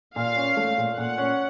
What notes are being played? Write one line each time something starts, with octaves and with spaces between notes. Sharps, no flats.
A#2 F5
C#4
A3
A#2
A#2 F#5
C#4